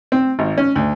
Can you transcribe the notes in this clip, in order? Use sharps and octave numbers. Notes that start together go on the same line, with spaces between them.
C4
G#1
C#4
D2